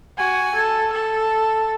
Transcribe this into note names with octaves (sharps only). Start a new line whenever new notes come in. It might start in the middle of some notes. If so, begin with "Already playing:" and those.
F#4 G#5
A4
A4